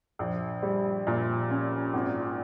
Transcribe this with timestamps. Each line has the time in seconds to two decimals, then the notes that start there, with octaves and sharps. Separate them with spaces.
0.19 A#1
0.63 G3
1.07 A#2
1.50 C#4
1.93 G#1